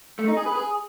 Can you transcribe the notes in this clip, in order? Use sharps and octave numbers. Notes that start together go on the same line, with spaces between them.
A3
D#4
G#4
B4
G#4